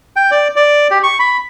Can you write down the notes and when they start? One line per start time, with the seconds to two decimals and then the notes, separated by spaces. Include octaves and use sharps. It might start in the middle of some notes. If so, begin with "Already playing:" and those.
0.16 G5
0.31 D5
0.56 D5
0.91 G4
1.03 C#6
1.19 B5